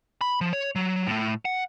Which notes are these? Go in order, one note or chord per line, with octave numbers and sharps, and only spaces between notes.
B5
F3
C#5
F#3
A2 A3
F#5